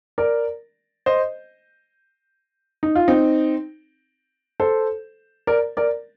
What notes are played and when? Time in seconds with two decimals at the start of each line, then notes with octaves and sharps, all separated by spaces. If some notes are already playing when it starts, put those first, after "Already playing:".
0.18 A#4 D5
1.06 C5 D#5
2.83 D#4
2.95 F4
3.08 C4 D#4
4.60 A4 C5
5.47 A#4 D5
5.77 A#4 D5